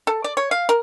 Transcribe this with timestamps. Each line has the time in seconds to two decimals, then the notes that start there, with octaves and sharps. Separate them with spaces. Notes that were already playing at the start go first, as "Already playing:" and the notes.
0.07 A4
0.24 D5
0.37 C#5
0.51 F5
0.69 A#4